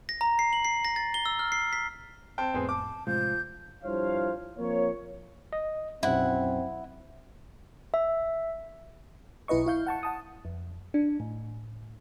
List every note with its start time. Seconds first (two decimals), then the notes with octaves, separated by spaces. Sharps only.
0.09 A#6
0.21 A#5
0.39 C7
0.53 F#7
0.65 C7
0.85 A#6
0.96 A6
1.14 G7
1.26 E6
1.39 F6
1.52 C7
1.73 B6
2.38 C4 G5 A5
2.54 F2 A2 B3 C4 G#4
2.69 A5 D6
3.07 A2 C3 F3 G#3 G6
3.83 G2 F3 E4 C5 C#5 F5
4.58 F3 A#3 C4 C#5
5.53 D#5
6.03 B1 F#2 C4 E4 F#5
7.94 E5
9.48 B1 E4 B4 D#5 C#6
9.66 E4 F5 G6
9.87 F#5 A5 C#6
10.03 F#5 A5 D#6
10.45 F2
10.94 D4
11.20 A2